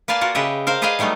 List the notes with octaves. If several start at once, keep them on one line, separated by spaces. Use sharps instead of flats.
A#3 B4 D5 F5 G#5 A5
F4 F#4 A#4
C#3 G4 B4 D#5 E5
A#4 C5 F5
G#4 B4 D5 D#5 F5 G#5
F#3 G3 A3 B3 D#4